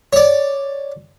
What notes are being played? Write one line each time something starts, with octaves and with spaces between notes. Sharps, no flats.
C#5 D5